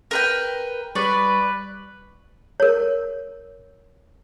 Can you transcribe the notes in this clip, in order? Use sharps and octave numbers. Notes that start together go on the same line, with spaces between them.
A#4 B4 G5
G3 B4 D5 C#6 A6
A#4 C#5